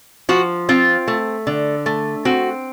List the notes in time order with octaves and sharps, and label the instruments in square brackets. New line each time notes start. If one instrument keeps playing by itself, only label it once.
[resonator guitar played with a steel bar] F3 F#4
C4 F4
A3
D3
A3
C4 F#4